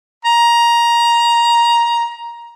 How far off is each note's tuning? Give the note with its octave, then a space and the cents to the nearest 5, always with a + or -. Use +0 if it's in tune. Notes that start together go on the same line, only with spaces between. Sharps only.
A#5 +15